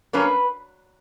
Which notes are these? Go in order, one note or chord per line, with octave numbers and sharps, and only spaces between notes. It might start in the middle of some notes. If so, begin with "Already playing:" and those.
G2 F#3 A#3 C#4 B4